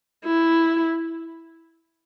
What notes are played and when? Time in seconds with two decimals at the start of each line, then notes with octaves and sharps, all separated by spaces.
0.25 E4